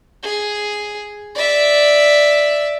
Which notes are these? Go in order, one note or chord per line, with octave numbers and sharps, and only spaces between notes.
G#4
D5 E5